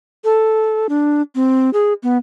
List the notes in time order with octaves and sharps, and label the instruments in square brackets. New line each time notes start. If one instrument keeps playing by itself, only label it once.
[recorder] A4
D4
C4
G#4
B3